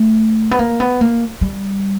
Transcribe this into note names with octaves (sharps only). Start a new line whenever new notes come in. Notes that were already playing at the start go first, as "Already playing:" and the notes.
Already playing: A3
B3
A#3
B3
A#3
G3